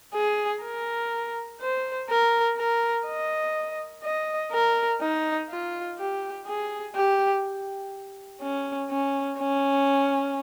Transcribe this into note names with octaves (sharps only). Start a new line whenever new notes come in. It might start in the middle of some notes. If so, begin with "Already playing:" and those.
G#4
A#4
C5
A#4
A#4
D#5
D#5
A#4
D#4
F4
G4
G#4
G4
C#4
C#4
C#4